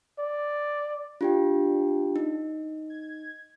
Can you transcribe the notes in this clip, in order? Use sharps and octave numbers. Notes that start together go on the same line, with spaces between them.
D5
D4 F4 G4 G5
D#4
G#6